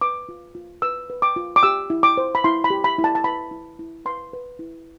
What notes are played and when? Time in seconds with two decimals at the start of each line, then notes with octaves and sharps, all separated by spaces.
0.01 B4 D6
0.29 F4
0.55 F4
0.82 B4 E6
1.10 B4
1.22 D6
1.36 F4
1.56 D6
1.63 G4 E6
1.90 E4
2.03 D6
2.17 C5
2.35 B5
2.44 E4 C6
2.64 B5
2.70 G4
2.84 B5
2.98 E4
3.04 A5
3.15 A5
3.24 B4 B5
3.51 E4
3.79 E4
4.05 B4 C6
4.33 B4
4.59 E4